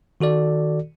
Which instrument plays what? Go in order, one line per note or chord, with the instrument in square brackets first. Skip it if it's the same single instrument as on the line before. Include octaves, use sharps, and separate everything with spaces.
[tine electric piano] D#3 F#4 A4 D5